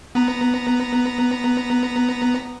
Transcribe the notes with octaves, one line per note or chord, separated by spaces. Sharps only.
B3 A#5